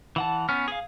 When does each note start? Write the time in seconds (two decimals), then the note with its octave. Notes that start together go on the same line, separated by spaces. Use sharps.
0.16 E3 F#5 A5
0.49 B3 C#4 F6
0.68 G#4 F5